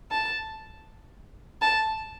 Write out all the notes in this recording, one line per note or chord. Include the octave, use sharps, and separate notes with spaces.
A5
A5